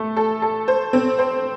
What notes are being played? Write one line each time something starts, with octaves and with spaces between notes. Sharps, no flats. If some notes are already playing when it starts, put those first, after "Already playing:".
Already playing: A3 A4
A4
A4
C5
C4
C5